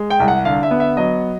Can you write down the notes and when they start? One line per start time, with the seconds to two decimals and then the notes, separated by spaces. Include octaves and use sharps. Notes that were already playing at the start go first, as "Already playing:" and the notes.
Already playing: G#3
0.10 G5
0.20 C2
0.28 F#5
0.45 D3 F5
0.63 E5
0.71 B3
0.80 E5
0.97 F#3 D#5